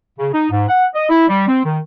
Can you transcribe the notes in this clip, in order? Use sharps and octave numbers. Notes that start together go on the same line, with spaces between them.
C#3
D#4
G#2
F#5
D#5
E4
G3
C4
D#3